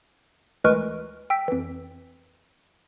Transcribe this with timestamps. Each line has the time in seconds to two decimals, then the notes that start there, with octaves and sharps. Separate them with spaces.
0.64 D2 E3 G#3 A#4 B4 C#6
1.30 G5 E6 B6
1.48 F2 E3